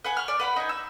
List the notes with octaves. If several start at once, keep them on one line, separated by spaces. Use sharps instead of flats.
B4 F#5 G#5
C#6 F6
D5
B4 F#5 B5
D#4 G#5
E6